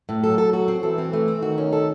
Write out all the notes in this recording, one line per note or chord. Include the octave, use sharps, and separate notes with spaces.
A2
F#3 A4
A4
F#4
C4
E3 A4
C4
A3
C4
D#3 F#4
C#4
A4